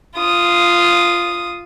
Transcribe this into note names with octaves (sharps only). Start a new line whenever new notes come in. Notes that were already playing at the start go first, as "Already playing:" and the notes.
F4 D#6